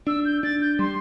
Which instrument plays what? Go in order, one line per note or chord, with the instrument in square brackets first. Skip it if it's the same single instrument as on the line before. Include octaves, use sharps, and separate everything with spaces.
[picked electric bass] D4 [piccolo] E6
[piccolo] G6
[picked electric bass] D4 [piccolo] A6
[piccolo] G6
[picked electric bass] G3 [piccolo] C6